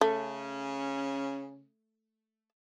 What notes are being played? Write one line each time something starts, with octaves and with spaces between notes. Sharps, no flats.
C#3 A3 C#4